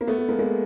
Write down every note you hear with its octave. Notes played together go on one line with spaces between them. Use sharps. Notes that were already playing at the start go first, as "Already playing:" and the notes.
A#3
A3 B3
A3
G#3 A#3
G#3 A#3